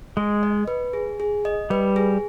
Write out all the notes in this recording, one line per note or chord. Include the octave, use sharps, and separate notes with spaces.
G#3 G#4
D#5
B4
G#4
G#4
D#5
G3 B4
G#4